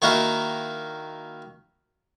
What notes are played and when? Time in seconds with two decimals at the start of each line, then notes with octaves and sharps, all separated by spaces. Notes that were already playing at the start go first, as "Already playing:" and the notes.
0.02 D#3 A#3 D#4 E4 F#4 A#4